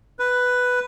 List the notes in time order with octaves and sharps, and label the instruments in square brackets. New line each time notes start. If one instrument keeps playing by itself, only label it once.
[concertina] B4